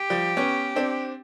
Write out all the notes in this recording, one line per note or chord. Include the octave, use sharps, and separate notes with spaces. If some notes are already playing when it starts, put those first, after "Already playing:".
Already playing: G4
F3 G3
B3 C#4
C4 D4